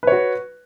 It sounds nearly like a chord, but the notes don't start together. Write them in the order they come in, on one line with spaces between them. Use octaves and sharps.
B4 C#5 F#4